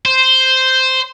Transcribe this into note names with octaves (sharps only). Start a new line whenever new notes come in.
C5